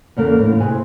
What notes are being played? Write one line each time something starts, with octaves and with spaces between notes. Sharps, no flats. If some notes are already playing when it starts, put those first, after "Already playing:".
E2 C#3 A#3 A4
A2 D3
C3 G#4 B4 G#5